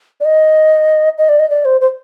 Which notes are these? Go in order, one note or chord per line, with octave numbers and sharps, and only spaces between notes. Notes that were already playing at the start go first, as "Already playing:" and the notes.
D5
D#5
D#5
D5
D#5
D5
C5
C5